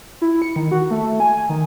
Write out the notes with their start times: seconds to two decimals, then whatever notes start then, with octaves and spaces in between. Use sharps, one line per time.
0.22 E4
0.42 C#7
0.56 D#3
0.71 F#4
0.91 A3
1.20 G#5
1.49 D#3